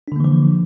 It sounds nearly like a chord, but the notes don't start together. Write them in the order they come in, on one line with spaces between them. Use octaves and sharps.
D4 D3 A#3 E3 F3